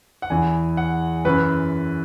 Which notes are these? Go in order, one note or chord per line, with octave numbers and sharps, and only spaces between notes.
F#5
E2 E3 G#5
F#5
F#2 E3 B4